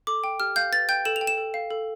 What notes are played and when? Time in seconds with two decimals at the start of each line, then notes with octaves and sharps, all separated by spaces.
0.07 A4 D6
0.24 G5
0.40 G4 F6
0.56 F5 G6
0.72 B4 A6
0.89 G5 G6
1.05 A4 E7
1.16 F7
1.21 G5
1.27 E7
1.38 A4
1.54 F5
1.71 A4